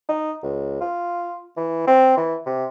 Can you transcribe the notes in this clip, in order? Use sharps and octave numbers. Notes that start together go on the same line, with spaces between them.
D#4
C#2
F4
E3
C4
E3
C3